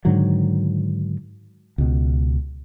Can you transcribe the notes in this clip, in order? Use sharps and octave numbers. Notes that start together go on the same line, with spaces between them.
G#2 D3 D#3 F#3
C#2 B2